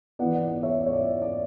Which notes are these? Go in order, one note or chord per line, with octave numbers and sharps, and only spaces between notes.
E3 B3 D5 F#5
D5
D5
C#5 E5
D5
C#5
D5
D5